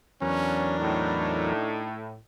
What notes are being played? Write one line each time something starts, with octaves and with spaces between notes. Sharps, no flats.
E2 F#3 C#4 D4 A#4
A2 D#4